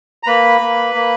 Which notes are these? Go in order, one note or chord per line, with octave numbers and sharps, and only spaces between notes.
A#5
A#3 B4 B5
A#3
A#3